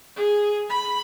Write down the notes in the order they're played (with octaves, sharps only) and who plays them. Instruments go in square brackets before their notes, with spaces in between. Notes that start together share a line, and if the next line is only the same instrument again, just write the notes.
[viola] G#4
B5